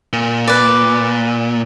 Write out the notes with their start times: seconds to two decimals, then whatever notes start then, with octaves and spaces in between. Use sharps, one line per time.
0.13 A#2
0.48 B4 D5